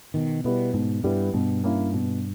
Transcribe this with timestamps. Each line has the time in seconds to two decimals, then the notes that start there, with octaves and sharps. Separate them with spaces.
0.14 B2 D#3
0.44 B2 G3 B3 E4
0.74 G#2 B2
1.04 G2 G3 B3 E4
1.33 G2 B2
1.64 A#3 C#4 E4
1.93 B2